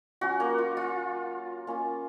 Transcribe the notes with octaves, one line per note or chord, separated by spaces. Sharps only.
F#3 C#4 F4 F#4
A#3 A#4
F4
F4
A#3 C#4 F4